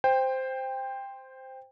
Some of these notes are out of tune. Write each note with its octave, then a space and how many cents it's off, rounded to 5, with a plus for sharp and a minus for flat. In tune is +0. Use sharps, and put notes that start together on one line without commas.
C5 -5 G5 +15